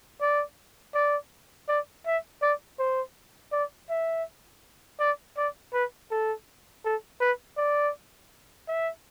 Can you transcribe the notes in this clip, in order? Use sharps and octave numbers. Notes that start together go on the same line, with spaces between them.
D5
D5
D5
E5
D5
C5
D5
E5
D5
D5
B4
A4
A4
B4
D5
E5